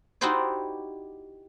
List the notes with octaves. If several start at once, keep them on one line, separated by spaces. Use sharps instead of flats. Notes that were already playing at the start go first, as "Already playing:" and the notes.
D#4 E4 F#4 G4 C5 D5